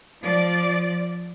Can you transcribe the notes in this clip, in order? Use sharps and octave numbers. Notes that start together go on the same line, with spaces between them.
F3 D5